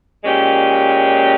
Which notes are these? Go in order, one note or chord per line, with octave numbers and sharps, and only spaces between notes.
A#2 G#3 C#4 G4